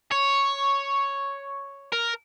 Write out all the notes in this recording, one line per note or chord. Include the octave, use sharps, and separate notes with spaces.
C#5
A#4